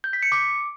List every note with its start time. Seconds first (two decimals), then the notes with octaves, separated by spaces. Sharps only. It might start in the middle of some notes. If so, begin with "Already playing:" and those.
0.04 G6
0.13 B6
0.23 C#7
0.32 D6